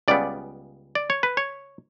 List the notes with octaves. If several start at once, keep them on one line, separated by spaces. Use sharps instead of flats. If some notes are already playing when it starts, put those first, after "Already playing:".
C#2 C#3 G3 B3 D5
D5
C#5
B4
C#5